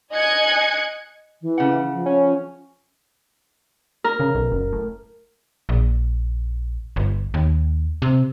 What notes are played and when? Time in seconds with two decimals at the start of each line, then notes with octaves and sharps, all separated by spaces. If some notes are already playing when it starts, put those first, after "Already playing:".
0.13 D#5 G#5 F#6 G#6 C#7
1.42 E3
1.58 C#3 F#5
1.93 F3
2.06 C#4
4.04 A#4
4.20 C#3
4.35 B1
4.52 F#1
4.73 A2
5.69 A#1
6.96 G1
7.34 D#2
8.02 C3